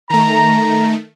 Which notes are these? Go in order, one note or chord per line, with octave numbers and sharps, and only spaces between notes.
D#3 A3 A#5